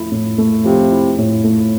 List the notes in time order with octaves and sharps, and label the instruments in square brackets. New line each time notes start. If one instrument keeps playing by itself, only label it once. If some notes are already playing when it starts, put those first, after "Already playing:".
Already playing: [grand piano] F3 A3 E4
A2
A3
[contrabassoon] C3 [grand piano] F3
[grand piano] E4
A2
A3